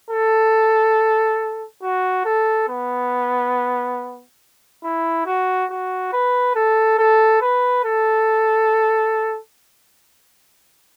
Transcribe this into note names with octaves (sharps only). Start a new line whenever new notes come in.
A4
F#4
A4
B3
E4
F#4
F#4
B4
A4
A4
B4
A4